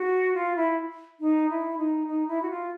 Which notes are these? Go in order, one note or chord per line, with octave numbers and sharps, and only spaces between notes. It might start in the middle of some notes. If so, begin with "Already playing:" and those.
Already playing: F#4
F4
E4
D#4
E4
D#4
D#4
E4
F#4
F4